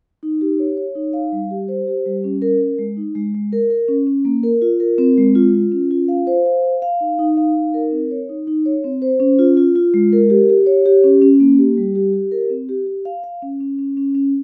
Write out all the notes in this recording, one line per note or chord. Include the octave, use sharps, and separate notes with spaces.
D#4
G4
C#5
C#5
D#4
F5
G3
G4
C5
G4
G3
C#4
A#4
A#4
G#3
D#4
G#3
G#3
A#4
A#4
C#4
C#4
A#3
A#4
F4
A#4
C4
G#3
F4
F4
C#4
F4
F5
C5
F5
F5
F5
D#4
D#4
F5
D#4
A#4
C4
C#5
D#4
D#4
C#5
C4
C5
C#4
F4
F4
F4
G#3
A#4
G4
G4
C#5
G4
C#4
C#4
A#3
G4
G3
G4
G4
A#4
C4
G4
G4
F5
F5
C#4
C#4
C#4
C#4
C#4